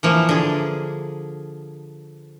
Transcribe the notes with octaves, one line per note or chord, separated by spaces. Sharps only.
E3 F3 A#3
D3 G#4